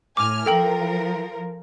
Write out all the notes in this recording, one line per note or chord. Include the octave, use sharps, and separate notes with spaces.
A2 G#5 D6 F6
F3 A4 A#4 G5 F#7